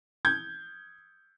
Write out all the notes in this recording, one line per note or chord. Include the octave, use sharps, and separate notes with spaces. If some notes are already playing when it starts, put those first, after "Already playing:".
G6 G#6